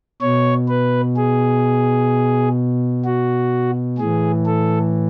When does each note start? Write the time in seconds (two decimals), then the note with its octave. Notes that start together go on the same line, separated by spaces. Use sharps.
0.21 B2 C#5
0.68 B4
1.16 G#4
3.05 F#4
3.98 A2 E3 G#4
4.46 A4